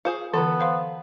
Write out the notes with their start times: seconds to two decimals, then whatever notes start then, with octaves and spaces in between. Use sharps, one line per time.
0.05 F4 G#4 C5 F5
0.33 D3 E3 F#3 B3 A4
0.60 C5 F5 C6